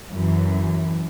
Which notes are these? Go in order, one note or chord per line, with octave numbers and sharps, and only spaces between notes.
F#2 E3